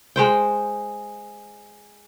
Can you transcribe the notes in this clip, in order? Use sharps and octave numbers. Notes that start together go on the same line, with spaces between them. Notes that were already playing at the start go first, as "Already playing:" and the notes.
G#3 C5 G5